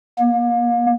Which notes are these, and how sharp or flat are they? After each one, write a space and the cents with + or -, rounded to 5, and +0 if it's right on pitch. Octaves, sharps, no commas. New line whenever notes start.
A#3 +35